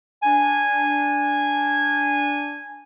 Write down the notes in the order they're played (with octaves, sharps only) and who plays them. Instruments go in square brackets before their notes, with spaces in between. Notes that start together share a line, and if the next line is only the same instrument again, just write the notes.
[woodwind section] D4 G#5